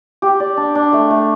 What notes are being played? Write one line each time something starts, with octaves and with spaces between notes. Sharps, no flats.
G4
D5
D4
D4
A3
A3